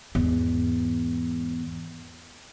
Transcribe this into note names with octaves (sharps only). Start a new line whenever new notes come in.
E2 G#2